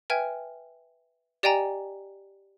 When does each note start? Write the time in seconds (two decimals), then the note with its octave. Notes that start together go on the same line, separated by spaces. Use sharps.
0.10 B4 E5 G5 G#5 F6 G#6
1.43 G4 D5 D#5 G5 G#5 A#5